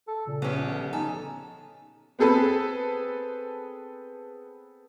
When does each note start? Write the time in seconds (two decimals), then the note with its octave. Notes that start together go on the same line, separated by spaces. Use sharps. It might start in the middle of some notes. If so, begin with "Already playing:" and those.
0.08 A4
0.27 A#2 C#3
0.42 A#1 B3 C#4 G4
0.69 D3 F3
0.93 D#4 A4 G#5
2.19 B3 C4 G#4 A4 B4 A5